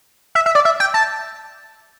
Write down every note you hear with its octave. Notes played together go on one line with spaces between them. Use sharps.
E5
E5
D5
E5
G5
A5